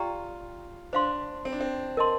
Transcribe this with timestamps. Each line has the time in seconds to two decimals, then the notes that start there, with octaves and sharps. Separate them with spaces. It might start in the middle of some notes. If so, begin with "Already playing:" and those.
Already playing: F4 G4 D5 G5 A#5
0.93 D4 C5 F5 C6
1.45 C4
1.52 D4
1.61 C4
1.97 A#4 D#5 A5 C6